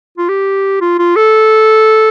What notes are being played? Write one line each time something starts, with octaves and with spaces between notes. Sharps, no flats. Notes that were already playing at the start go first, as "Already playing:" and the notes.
F4
G4
F4
F4
A4